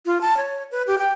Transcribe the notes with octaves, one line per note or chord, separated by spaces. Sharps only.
F4
A5
C#5
B4
G4
G5